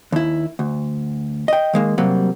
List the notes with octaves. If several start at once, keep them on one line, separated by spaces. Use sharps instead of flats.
D#2 E4
D2
D#5 G5
D#3 G#3 A#3
C3 F#3 G3 A#3